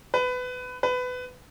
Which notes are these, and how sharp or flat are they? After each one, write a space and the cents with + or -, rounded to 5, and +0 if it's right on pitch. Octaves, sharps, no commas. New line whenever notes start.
B4 +20
B4 +20